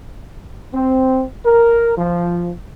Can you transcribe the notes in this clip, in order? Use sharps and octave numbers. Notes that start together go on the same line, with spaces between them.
C4
A#4
F3